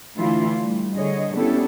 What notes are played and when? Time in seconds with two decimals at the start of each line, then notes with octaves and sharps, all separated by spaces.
0.16 D3 E3 A3 E4 F4
0.59 G3 A3
0.96 D3 G#4 C#5 D#5
1.36 B3 C#4 D4 E4 G4 A4